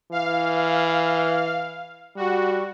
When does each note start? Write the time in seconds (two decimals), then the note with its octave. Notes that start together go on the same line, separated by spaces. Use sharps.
0.12 E3 F5
2.17 G3 F#4